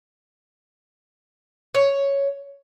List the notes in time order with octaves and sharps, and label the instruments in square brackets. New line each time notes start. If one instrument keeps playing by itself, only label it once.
[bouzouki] C#5